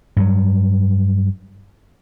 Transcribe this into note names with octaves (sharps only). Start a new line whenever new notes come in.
G2 F#3